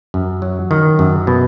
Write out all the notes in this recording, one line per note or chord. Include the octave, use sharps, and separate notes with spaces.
F#2
F#3
D#3
F#2
B2